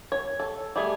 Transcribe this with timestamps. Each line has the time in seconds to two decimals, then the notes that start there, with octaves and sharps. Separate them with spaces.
0.12 C#5
0.40 A4
0.76 G3 A3 G#4